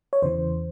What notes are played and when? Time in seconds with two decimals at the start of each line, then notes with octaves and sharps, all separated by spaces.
0.13 C#5
0.22 E2 C#3 E3 C5